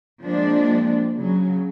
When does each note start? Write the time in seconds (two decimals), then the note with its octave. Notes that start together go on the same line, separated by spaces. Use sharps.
0.23 F3 G#3 A#3 C4 D4
1.17 C#3 F#3